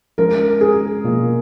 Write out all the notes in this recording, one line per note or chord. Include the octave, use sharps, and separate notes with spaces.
F3 G#3 C#4 A#4
G#4
B2 A#3 F4